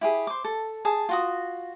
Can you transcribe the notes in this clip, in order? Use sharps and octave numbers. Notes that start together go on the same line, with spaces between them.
E4 G4 G#4
C5 D6
A4
G#4 A5 D#6
F4 F#4 D#6